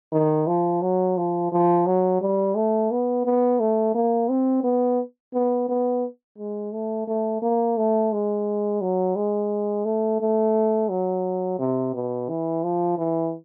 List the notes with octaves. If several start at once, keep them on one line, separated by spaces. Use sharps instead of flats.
D#3
F3
F#3
F3
F3
F#3
G3
A3
B3
B3
A3
A#3
C4
B3
B3
B3
G#3
A3
A3
A#3
A3
G#3
F#3
G#3
A3
A3
F#3
C3
B2
E3
F3
E3